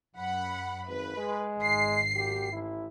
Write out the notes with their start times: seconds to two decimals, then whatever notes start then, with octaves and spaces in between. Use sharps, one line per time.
0.16 F#2 F#5 B5
0.87 G#1 B4
1.16 G#3
1.59 G#1 C7
2.15 F#2 G4
2.53 A1 E4